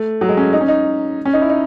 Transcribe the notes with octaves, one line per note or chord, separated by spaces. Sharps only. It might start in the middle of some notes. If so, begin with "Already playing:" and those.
Already playing: A3
F#3
G#3
C#4
D#4
C#4
D#4
C#4
D#4
E4
D#4